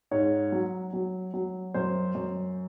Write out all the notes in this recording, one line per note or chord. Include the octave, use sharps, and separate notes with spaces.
G#2 C#5
F#3
F#3
F#3
F#2 C5
F#2